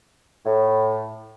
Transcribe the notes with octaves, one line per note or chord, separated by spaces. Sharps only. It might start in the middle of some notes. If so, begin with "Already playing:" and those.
A2